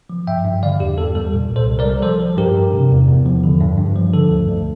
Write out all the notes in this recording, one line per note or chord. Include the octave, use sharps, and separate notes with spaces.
F3
G2 E5 G5
G2
D3 D5 F5
E2 G4
E2 A4
G3 A4
A#2
C2
A4 C5
C2
A#4 D5
G3
F3 A4 C5
F3
G2 G4 A#4
G2
C3
E2
E2
F3
D3
G2
G2
F3
D3 A4
D2
D2